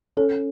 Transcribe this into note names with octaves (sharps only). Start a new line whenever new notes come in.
C#4 A4